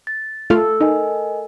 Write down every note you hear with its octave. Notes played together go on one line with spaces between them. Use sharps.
A6
A3 F4 A4 F5
D#4 A#4 D#5 G#5